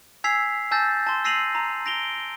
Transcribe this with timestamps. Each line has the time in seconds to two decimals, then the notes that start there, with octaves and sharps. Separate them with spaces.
0.24 G#5 E6 G#6 B6 C7 F7
0.71 G#5 A5 E6 G6 A6 A#6
1.07 A5 C6
1.24 E6 A#6 C7 D#7 F7 F#7
1.55 A#5
1.86 A#6 D7 F7 G7